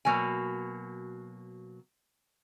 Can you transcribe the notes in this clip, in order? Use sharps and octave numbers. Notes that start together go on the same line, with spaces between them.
B2 F#3 A#3 G#5